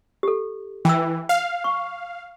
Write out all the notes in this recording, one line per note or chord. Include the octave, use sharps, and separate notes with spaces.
G4 A4
E3 G5 E6
F5
C#6